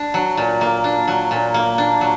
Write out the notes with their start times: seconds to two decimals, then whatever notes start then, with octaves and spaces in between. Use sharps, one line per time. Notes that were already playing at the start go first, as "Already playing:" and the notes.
Already playing: D4
0.14 F#3
0.37 A#2
0.61 A#3
0.84 D4
1.08 F#3
1.31 A#2
1.54 A#3
1.78 D4
2.01 F#3